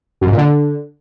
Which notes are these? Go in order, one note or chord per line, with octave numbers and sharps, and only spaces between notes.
F#2
G#2
A#2
D3